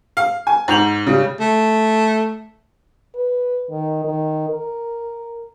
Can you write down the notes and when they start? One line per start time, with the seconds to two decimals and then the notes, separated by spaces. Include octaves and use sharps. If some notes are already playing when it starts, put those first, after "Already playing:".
0.17 F5
0.47 G#5
0.68 G#2 G6 F7 F#7
1.07 C#3 G3
1.40 A3
3.15 B4
3.71 D#3
4.05 D#3
4.49 A#4